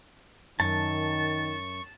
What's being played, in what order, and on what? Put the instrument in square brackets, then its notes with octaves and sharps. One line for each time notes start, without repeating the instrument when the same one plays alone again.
[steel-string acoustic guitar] F#2 [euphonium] D#3 [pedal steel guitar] A5 [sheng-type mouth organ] C#6